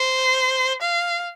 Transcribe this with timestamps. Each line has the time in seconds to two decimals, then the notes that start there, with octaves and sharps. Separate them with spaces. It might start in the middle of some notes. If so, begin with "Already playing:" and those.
Already playing: C5
0.81 F5